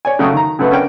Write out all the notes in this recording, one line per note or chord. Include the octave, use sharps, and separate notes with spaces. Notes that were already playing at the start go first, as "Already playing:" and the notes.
C#5 D5 G#5
C#3 F#3 A3 G5 D#6
D#3 A#5
F#2 C#3 A3 B3
C#4 D4 A#4 B4 G5